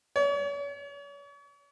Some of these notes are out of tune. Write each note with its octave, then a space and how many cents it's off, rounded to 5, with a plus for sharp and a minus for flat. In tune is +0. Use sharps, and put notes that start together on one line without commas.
C#5 +40